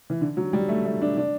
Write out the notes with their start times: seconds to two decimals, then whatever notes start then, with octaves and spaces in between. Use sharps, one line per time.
0.10 E3
0.21 D3
0.37 F#3
0.53 G3
0.69 A3
0.85 A3
1.02 D4
1.17 D4